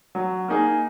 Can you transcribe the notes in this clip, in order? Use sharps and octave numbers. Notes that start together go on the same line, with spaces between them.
F#3
A#3 D#4 G#4